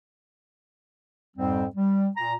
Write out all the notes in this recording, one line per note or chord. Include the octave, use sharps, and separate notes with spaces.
F2 G#2 G3 C4
G3
A#2 A#5